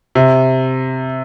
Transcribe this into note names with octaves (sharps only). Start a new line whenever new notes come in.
C3